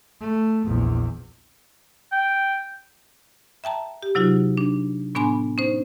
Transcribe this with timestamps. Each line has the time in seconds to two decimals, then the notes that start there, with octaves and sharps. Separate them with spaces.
0.20 A3
0.65 A#1 E2
2.12 G5
3.64 E5 G5 A5 A#5
4.03 G4
4.15 C3 F#3 D#4 F4 F#4
4.57 D4
5.15 A2 B3 D4 G#5 B5 C6
5.58 C#4 D#4 C5